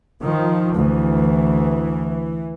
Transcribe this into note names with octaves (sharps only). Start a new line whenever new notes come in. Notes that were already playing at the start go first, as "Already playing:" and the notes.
D#3 F3
D2 E3